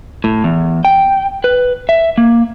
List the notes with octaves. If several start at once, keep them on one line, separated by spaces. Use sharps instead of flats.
A2
E2
G5
B4
E5
A#3